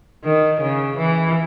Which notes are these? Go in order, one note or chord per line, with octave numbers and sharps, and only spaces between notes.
D#3
C#3
E3